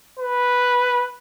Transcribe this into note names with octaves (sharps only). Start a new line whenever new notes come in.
B4